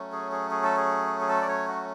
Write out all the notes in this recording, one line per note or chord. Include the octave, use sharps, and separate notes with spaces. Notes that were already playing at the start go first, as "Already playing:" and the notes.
Already playing: F#3 A3 C#4
G#4
G#4
G#4
A4
G#4
G#4
A4
D5
C#5
F#4